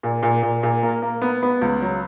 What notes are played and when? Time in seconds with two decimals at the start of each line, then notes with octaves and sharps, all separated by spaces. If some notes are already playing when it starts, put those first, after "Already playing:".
0.03 A#2
0.23 A#2
0.43 A#2
0.63 A#2
0.83 A#3
1.02 A#3
1.22 B3
1.43 B3
1.62 C#2
1.82 F#3